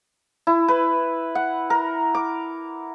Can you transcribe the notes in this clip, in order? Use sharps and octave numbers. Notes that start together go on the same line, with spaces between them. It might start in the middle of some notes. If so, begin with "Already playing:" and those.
E4
B4
F#5
A#4
D6